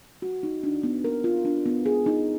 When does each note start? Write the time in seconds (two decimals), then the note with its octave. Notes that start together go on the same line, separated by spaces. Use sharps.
0.22 F#4
0.43 D#4
0.63 D4
0.83 B3
1.04 A#4
1.24 F4
1.45 D4
1.66 B3
1.86 G#4
2.06 D#4